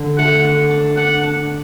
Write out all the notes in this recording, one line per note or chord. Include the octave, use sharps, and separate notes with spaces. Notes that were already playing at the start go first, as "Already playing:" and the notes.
Already playing: D3
A3 F#5
D4
D4
D4 F#5
D4